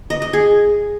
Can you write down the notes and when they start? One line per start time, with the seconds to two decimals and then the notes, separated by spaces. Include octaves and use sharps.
0.10 D#5
0.22 D#5
0.33 G#4